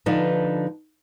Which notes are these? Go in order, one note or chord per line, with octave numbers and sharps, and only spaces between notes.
D3 F3 D4 D#4 B4